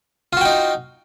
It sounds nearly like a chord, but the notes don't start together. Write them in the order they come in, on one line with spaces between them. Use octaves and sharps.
F4 F#4 G5 D#4